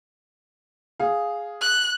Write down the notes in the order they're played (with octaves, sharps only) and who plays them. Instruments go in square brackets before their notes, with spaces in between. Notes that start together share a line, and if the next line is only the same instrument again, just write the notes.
[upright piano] G#4 F5
[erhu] F#6